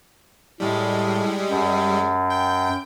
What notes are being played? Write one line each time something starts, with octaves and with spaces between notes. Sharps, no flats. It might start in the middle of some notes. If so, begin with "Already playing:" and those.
A2 G3 G#3
F#2
G5